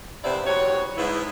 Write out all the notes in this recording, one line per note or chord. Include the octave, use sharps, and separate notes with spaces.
D#2 C3 B3 E4 C5 D5
E2 G3 F#4 C#5
G#2 B3 E4